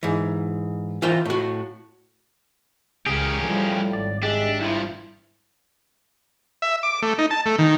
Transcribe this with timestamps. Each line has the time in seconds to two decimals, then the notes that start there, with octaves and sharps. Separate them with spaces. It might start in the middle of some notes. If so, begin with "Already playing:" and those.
0.03 G#2 E3
1.02 E3 F4 A#4 C5 G5
1.25 A2 F#4
3.06 C#2 C#3 C#4 G4 G#4 A#4
3.43 A2 F3 G3
3.93 G#1 D5
4.23 G#3 D4 G4 E5
4.61 G2 F3 E4
6.62 E5
6.83 D6
7.02 A3
7.18 D#4
7.31 A5
7.46 A3
7.58 D#3